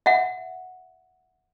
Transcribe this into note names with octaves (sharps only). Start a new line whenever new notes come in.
E5 F#5